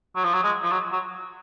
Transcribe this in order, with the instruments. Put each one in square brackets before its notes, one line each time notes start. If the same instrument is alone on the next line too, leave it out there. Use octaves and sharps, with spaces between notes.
[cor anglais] F#3
F3
F#3
G#3
F3
F#3
F#3